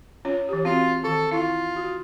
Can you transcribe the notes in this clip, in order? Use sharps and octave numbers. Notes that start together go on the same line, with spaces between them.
C#4 F4 C#5
E3 G4
C4 F4 F#4
D#3 A4
E4 F4
F#4